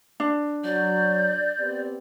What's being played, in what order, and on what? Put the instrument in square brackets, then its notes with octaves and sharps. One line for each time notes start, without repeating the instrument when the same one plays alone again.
[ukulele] D4
[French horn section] F#3 [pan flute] D5 [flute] G6
[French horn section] B3 C4 G4